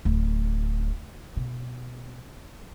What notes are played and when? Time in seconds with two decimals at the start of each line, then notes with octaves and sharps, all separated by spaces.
0.05 D1
1.37 B2